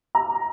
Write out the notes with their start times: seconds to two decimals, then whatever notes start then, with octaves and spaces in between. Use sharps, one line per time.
0.15 A#5